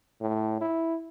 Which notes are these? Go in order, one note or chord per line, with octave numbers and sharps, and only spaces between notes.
A2
E4